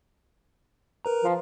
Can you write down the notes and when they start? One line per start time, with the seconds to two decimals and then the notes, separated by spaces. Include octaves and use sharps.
1.05 A#4 B4 A#5
1.24 F3